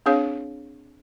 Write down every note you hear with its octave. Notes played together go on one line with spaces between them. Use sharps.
C4 D4 G#4 C#5 F5